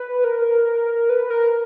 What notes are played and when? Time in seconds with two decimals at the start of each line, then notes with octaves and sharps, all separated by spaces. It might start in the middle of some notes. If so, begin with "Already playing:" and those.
Already playing: B4
0.24 A#4
1.09 B4
1.30 A#4